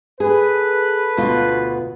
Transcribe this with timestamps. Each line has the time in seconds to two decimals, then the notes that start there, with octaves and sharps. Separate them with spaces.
0.20 G#4 A4 B4
1.17 D2 B2 F4